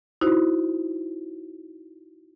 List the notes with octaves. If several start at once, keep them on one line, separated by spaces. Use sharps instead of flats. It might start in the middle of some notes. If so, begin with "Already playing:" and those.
D#4 E4 F#4 C5